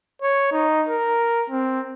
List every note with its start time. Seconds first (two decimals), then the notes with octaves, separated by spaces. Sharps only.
0.22 C#5
0.52 D#4
0.88 A#4
1.50 C4